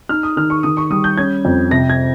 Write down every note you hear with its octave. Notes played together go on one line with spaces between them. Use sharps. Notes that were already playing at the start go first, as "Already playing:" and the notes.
D#4 F6
D#6
D#3 F6
C#6
D#3 D#6
C#6
G3 D#6
G6
C#4 G#6
F2
C3 A#6
G#6